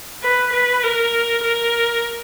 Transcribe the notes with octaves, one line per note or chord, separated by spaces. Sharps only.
B4
B4
A#4
A#4